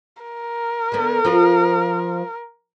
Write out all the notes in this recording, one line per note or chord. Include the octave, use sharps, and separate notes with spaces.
A#4
D3 B3
F3 C4 F4